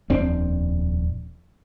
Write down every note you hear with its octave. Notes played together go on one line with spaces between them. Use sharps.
D#1 F2 C4 D4